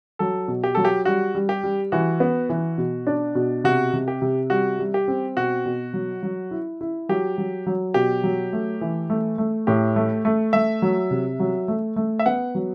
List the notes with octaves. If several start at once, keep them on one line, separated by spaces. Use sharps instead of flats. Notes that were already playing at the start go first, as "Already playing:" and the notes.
F#3 A4
B2
G4
F#3 A4
G4
G3 F#4
G3
G4
G3
E3 F#4
B3
E3
B2
D4
B2
C3 F#4
C3
G4
C3
G3 F#4
G3
G4
C4
B2 F#4
B2
F#3
F#3
E4
E4
F#3 G4
F#3
F#3
B2 G4
F#3
A3
E3
A3
A3
A2 G4
A3
A3
A3 E5
F#3
C3
F#3
A3
A3
E5
B3 F#5
F#3